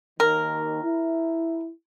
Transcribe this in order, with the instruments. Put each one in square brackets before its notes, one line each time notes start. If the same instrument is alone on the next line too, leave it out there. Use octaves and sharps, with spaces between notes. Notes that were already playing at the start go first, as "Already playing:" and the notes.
[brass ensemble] D#2 D#3 [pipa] A#4
[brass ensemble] E4